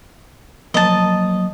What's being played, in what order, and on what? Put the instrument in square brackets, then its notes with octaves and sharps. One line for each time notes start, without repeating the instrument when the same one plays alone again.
[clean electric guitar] F3 F#3 A#3 [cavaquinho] D#5 A5